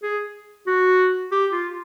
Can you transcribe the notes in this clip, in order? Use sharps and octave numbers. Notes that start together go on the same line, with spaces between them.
G#4
F#4
G4
F4